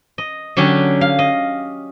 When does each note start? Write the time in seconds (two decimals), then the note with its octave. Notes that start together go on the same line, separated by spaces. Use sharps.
0.18 D#5
0.57 D3 F#3 C#4 G4
1.01 F5
1.19 D#5